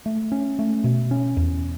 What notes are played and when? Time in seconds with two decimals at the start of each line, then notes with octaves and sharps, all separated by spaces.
0.06 A3
0.32 C#4
0.59 A3
0.84 B2
1.11 C#4
1.37 E2